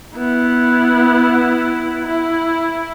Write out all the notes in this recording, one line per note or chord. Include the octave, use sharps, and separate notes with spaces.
B3 E4
E4